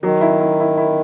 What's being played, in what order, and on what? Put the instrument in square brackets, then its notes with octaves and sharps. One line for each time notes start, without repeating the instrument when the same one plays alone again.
[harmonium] D#3 [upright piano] F#3
[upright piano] E4
E4
E4
E4